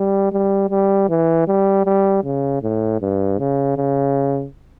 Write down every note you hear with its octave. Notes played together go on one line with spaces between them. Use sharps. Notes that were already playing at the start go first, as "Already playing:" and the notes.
Already playing: G3
G3
G3
E3
G3
G3
C#3
A2
G2
C#3
C#3